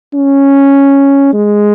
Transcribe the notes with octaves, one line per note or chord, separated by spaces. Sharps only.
C#4
G#3